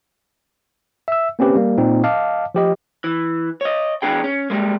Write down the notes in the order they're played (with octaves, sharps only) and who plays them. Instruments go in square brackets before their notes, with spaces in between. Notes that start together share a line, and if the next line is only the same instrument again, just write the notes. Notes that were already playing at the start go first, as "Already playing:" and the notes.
[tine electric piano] E5 E6
A#3 C4 C#4 G4 B4
G3 A#3
A#2 C4 D#4
D#5 F5 A5 D6
F3 G4 D#5
[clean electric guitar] E3
C#5 D#5
E2 A#2 B3 D4 G#4 G5
C#4
G3 G#3 A#3